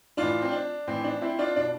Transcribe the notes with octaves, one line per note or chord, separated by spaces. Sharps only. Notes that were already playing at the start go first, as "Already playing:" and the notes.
A2 E3 D4 F4
C4
D4
A2 E3 C4
D4
C4 E4
D4 F4
B2 D4